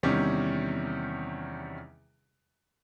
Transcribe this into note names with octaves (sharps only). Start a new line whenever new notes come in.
E2 C3 D#3 G3 C#4